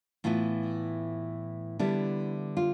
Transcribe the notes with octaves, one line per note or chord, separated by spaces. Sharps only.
A2 E3 B3 E4 F4
D3 G3 B3 E4
F4